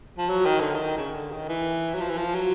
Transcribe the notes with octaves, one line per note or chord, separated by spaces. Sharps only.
F3
F#3
D#3
D3
D#3
C#3
D3
D#3
E3
F#3
F3
E3
F3
F#3